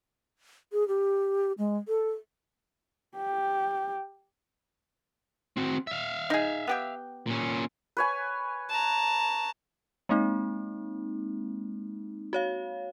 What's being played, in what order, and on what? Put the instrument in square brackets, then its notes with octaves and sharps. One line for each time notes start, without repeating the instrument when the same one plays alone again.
[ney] G#4
G4
G#3
A4
[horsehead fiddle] G4
[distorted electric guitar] C4 F#4
E5 F5
[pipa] D#4 G#4
B3 G4 G5
[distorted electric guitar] A#2 C#4
[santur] B4 C#5 G#5
[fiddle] A5 A#5
[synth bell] G#3 A#3 C4 D#4
F#4 C#5 F5